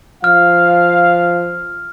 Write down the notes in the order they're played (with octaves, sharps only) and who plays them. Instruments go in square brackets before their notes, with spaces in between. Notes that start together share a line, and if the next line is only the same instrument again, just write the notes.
[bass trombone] F3 [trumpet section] F5 [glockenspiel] F6